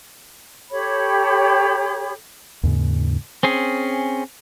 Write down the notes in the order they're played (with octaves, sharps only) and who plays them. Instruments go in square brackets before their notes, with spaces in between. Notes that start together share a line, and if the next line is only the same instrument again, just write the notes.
[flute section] G4 A4 C#5 B5
[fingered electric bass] D#2 G#2 C#3
[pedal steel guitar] C4 C#4 G#4